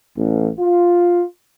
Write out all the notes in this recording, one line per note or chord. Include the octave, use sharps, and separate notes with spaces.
A1
F4